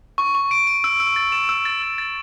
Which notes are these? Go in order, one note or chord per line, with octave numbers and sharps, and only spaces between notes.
C#6
C#6
D7
D7
E6
E6
A6
E7
E6
A6
E6
A6